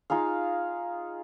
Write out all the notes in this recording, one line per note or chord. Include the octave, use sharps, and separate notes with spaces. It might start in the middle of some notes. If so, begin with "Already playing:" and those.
D#4 F4 G#4 F5